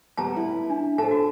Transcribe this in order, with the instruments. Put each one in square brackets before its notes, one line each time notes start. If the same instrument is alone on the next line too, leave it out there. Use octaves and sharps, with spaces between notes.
[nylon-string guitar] D2 G3 B3 [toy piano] A5 A#5
[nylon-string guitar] E4
[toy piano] D4
[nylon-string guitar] A4 C5 [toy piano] A5
[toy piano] F#4